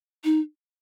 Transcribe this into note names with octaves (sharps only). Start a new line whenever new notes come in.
D#4